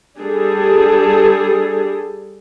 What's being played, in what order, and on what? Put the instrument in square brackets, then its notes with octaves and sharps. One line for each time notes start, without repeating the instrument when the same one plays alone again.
[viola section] G3 D4 G#4 A4